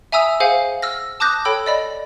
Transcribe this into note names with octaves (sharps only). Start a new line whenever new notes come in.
E5 G#5 A#5 D#6 E6
G#4 C5 F5 F#5 G#5
E6 F6 A#6
A5 D6 D#6 F#6 G6 A#6
A4 C#5 G5 B5 E6
D5 D#5 B5